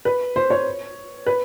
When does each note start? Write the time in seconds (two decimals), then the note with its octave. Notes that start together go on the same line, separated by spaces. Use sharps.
0.05 B4
0.36 C5
0.50 C#5
1.26 B4